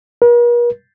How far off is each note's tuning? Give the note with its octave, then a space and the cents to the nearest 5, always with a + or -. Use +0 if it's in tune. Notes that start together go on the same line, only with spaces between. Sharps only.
A#4 +45